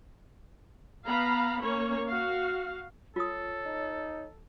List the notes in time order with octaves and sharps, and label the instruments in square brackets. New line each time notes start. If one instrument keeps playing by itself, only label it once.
[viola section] B3 F5 A#5 B5
A#3 C#4 C#5
F#4 F5
[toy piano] F4 D#6 [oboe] A4 [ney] C#5
[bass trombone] D#4